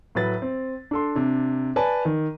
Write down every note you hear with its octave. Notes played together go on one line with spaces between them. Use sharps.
A2 F#3 B4 A6
C4
D4 A4 C6
C3 D4
B4 D5 G#5 A5
D#3